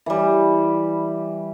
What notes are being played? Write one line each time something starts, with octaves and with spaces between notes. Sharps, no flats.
E3 G3